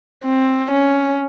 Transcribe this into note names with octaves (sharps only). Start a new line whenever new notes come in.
C4
C#4